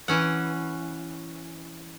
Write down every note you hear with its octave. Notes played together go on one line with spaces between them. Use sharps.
E3 C#4 F#5